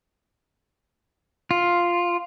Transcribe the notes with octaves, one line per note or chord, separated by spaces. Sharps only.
F4